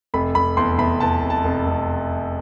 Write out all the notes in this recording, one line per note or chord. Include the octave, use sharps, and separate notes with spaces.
F1 B5
F1 B5
E2 C6
E2 B5
E2 A5
F1
A5
F1
F1